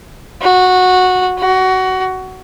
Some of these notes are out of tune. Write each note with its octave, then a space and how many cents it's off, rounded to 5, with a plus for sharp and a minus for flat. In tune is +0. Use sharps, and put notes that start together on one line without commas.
F#4 -10
F#4 +20